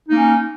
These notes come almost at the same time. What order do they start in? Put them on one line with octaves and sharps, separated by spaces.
D#4 A#3 C#4